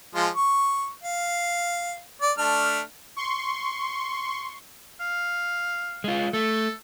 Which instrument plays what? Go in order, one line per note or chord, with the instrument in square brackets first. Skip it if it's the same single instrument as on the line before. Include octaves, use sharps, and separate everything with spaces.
[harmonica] F3 G#3 F4
C#6
F5
D5
A3 D4 F6
[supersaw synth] C6 C#6
[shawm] F5
[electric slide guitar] G#3 F4
[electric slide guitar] A3 [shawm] A4